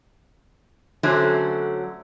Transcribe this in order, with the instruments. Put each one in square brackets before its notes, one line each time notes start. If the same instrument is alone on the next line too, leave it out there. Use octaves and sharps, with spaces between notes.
[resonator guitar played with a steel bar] D3 F#3 A3 C#4 F#4 C5